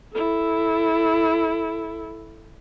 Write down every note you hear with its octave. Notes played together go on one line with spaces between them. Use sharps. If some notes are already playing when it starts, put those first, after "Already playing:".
E4 A4